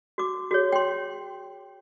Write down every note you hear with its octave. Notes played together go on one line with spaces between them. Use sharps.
F#4 D6
F#4 G#4 C#5
G5 C6